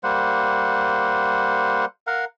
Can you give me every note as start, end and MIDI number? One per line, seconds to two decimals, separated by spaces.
0.04 1.85 55
0.04 1.85 58
0.04 1.85 72
0.04 1.85 78
2.07 2.25 70
2.07 2.25 77
2.07 2.25 78